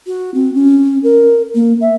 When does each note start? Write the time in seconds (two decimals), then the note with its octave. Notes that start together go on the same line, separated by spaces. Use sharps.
0.07 F#4
0.35 C4
0.54 C#4
1.04 A#4
1.55 A#3
1.81 E5